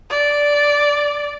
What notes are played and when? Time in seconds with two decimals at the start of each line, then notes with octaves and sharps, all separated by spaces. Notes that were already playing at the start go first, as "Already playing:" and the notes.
0.11 D5